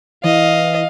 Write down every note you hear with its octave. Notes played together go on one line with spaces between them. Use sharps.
E3 D#5 F5